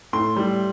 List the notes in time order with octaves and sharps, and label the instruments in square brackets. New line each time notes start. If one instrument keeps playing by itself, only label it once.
[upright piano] A2 C6
G3